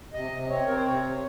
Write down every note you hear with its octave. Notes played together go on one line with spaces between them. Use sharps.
C3 D#5
C3
C4 C#5
C4 A#4
C5
C3 C#5
C3